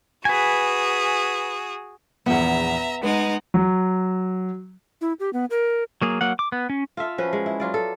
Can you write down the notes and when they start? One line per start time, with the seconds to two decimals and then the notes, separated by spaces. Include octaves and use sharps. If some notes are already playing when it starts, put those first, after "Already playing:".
0.25 F#4 G#4 B4 G#5
2.26 A#1 E2 B3 E5 A#5
3.03 G#3 D#4 B4 F#5
3.54 F#3
5.01 E4
5.20 G4
5.33 B3
5.50 A#4
6.02 F#3 A#3 G#4
6.21 F#3 A#3 F#5
6.39 D6
6.52 B3
6.70 C#4
6.97 F4 A4 E5 F5
7.18 F3 C#4 F#4 B4
7.33 G#3
7.46 E4
7.60 F#3 F4 D5
7.74 A4